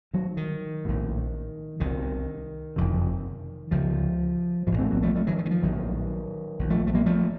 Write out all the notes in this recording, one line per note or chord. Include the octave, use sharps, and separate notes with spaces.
D#3 F#3
D#3
A#1 A2
C2 C3 D#3
F#1 F2 C3
C#2 C#3 F3
A#1 A2 F3
A3 C4
F#3 A#3
F3 A3
F3 A3
D#3 F#3
F3
D#3
F3
A#1 A2 D#3 F#3
A#1 A#2
F3 A3
A3
F#3 A#3
F3 A3